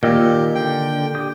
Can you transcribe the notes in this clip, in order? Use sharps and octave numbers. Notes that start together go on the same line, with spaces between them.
A#2 D#3 G4 D#5 E6
D3 G5
G4 G5 D#6